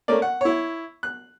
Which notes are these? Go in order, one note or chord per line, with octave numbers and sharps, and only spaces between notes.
A3 A#3 C#4 A#4 D5
F#5
E4 C#5
F#6